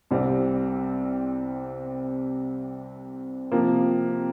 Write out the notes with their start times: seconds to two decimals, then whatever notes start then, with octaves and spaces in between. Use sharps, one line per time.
0.11 C2 C3 G3 C4
3.52 C3 F3 A#3